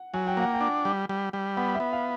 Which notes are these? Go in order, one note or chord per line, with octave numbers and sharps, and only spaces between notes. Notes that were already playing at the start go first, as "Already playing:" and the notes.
Already playing: F#5
F#3 G#5
G5
A#3 F#5
G5
D4
G3
G3
G3
B3 F#5
E5
B3
F5